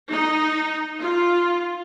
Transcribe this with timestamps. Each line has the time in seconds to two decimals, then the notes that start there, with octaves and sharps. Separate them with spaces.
0.10 D#4
1.00 F4